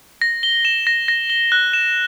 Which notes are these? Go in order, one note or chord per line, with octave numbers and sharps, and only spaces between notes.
A#6
G7
E7
A#6
A#6
G7
F#6
E7